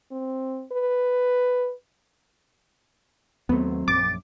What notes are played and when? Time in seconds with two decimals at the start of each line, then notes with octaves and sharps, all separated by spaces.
0.12 C4
0.72 B4
3.49 D#2 F#3 A3 B3 C4
3.88 A#1 F#2 D6 A6